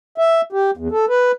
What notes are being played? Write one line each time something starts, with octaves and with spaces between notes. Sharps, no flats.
E5
G4
E2
A4
B4